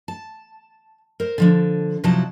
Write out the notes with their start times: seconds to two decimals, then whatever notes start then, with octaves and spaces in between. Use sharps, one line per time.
0.08 A5
1.20 A#4 C5
1.38 D3 F3 D4
2.04 C3 F3 F#3 D#4 E4 A5